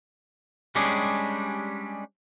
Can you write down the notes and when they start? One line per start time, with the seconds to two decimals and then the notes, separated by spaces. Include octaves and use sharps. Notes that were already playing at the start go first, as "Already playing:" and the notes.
0.75 G3 G#3 C#4 D4 G4 G#4